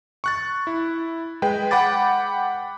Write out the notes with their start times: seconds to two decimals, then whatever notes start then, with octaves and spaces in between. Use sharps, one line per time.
0.24 C#6 F#6 A6
0.67 E4
1.42 G#3 B4 G5
1.71 F#5 G5 B5 D6 A6